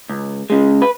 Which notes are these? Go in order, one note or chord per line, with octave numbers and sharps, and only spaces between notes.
C#2
C#3 G#3
B4